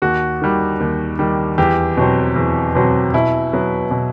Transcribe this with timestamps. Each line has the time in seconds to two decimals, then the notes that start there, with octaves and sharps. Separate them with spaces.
0.02 D#2 F#4
0.42 D#3 G3
0.80 D#2
1.19 D#3 G3
1.58 E2 G4
1.97 B2 F#3 C4
2.36 E2
2.75 B2 F#3 C4
3.14 B2 E4
3.53 F#3 B3
3.91 B2